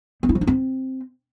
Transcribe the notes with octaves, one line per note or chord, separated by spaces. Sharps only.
B3
E4
F3
D#4
C4